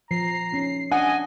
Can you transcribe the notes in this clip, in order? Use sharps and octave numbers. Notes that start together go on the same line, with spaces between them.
F3 A#5 C7
C#4 D#4
D4 D#5 F#5 G#5